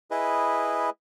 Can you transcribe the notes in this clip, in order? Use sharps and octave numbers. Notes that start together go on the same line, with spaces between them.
E4 G#4 B4 D#5